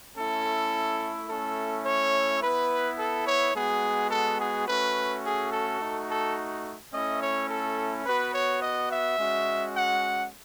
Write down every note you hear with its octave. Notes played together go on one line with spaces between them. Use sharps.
A3 C#4 E4 A4
A3 C#4 E4 A4
C#5
B3 E4 B4
A4
C#5
G#3 B3 F#4 G#4
A4
G#4
A3 C#4 F#4 B4
G#4
A4
A3 D#4 F#4
A4
A3 C#4 E4 D#5
C#5
A4
B3 F#4 B4
C#5
D#5
E5
G#3 C#4 F#4
F#5